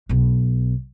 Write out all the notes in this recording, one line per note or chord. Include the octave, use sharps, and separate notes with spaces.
B1 B2